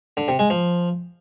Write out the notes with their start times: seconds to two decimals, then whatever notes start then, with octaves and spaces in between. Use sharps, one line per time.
0.17 D3
0.28 C3
0.39 G#3
0.50 F3